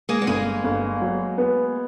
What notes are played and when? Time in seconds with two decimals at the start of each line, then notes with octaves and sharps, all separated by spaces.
0.09 G#3 A#3
0.22 B3
0.27 G1 G#3 A#3
0.64 G1
1.01 F#3
1.38 B3